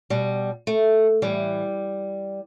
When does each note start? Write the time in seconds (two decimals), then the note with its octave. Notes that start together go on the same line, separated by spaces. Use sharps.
0.10 B2 G3
0.67 A3
1.22 A2 E3 G3